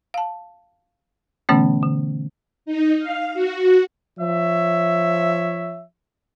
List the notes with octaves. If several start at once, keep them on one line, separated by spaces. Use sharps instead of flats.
F5 A5
B2 D3 E3 A3 B3 C#4
D3
D#4
F5
F#4
F3 C#5 E5